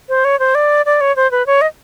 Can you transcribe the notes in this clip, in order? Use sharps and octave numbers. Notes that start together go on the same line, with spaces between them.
C5
C#5
C5
D5
D5
C#5
C5
B4
C#5
D#5